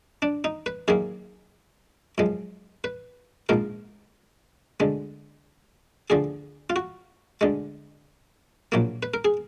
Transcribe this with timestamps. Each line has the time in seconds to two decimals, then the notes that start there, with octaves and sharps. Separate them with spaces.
0.22 D4
0.44 D#4
0.66 B4
0.88 F#2 D#3 A#3 G#4
2.18 F#2 F3 G#3
2.84 B4
3.49 A#1 G#2 F3 A#4
4.80 D2 D3 G#3
6.10 D2 D3 F3 G#4
6.70 F4
6.76 F#4
7.41 D2 D3 G#3
8.72 A#1 A#2 F#3 A#3
9.03 B4
9.14 A#4
9.25 G#4